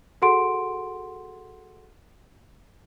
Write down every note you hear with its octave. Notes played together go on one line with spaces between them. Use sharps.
F#4 G#4 A4 F#5 C6 D7